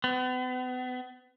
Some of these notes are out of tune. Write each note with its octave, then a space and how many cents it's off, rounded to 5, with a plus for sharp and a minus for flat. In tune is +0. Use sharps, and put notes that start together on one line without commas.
B3 +40